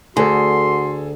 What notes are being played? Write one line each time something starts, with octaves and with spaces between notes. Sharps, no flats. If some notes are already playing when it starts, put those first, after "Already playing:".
D2 F#4 G#4 A4 C6